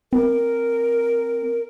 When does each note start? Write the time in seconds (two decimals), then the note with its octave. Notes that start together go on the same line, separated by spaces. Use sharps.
0.13 C4 A#4